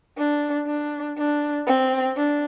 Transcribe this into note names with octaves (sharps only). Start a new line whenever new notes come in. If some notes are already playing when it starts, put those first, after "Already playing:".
D4
D4
D4
C4
D4